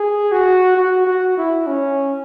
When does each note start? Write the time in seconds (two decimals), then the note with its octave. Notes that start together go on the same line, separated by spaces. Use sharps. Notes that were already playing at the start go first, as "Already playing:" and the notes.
Already playing: G#4
0.32 F#4
0.77 F#4
1.07 F#4
1.37 E4
1.67 C#4